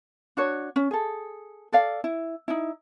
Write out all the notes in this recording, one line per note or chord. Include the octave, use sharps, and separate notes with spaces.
D4 F#4 C#5
C#4
G#4 A4
A4 D5 F5
E4
D#4 E4